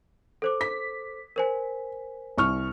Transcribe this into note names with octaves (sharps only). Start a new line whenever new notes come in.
A4 C5 D6
B6
A#4 C5 G#5
C2 C#6 F6